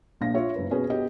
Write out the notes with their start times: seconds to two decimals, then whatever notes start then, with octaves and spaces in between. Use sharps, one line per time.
0.21 A#1 A#2 F5 A#6
0.34 F4 C#5 E5
0.56 F#1 B4
0.71 B2 C#4 G#4 B4
0.90 B2 B3 G4 D#5